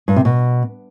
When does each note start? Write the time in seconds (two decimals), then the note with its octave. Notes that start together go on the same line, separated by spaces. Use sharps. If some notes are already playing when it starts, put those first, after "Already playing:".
0.08 G2
0.16 C3
0.25 B2